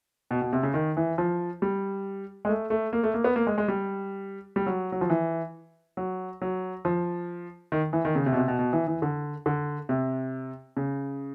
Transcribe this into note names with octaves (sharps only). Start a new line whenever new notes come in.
B2
B2
C3
C#3
D#3
E3
F3
G3
G#3
A3
A3
A#3
A3
A#3
B3
A#3
G#3
G#3
G3
G3
F#3
F#3
F3
E3
F#3
F#3
F3
D#3
E3
D#3
C#3
C3
B2
C3
B2
B2
E3
E3
D3
D3
C3
C#3